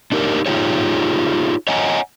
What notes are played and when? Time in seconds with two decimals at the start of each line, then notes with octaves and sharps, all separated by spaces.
0.12 D4 D#4 G4 A#4
0.46 D#4 F4 G4 G#4 C#5
1.68 C#5 D#5 F#5 G#5 A#5